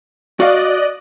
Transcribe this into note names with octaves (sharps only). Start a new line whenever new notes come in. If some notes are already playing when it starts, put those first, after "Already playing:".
F#4 D5 D#5 F5 F#6